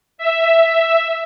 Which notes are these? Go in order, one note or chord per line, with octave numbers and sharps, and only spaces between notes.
E5